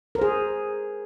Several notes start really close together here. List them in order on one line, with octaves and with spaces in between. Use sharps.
A#4 C5 G#4